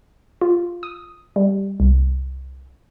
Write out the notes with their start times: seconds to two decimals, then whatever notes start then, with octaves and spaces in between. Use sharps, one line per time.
0.41 F4
0.83 D#6
1.36 G3
1.80 C2